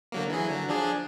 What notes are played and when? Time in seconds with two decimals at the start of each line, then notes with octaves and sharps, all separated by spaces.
0.12 D3 F#3 A#3
0.30 E3 F#3 G#4
0.48 D3 F#3
0.68 F3 D4 G#4